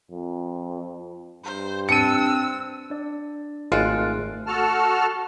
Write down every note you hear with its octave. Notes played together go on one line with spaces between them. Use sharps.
F2
G2 C5
C4 D4 E6 C#7 D#7
D4 D5
G#1 G#3 A3 F4 A4 F#6 D7
F#4 A4 A5 F6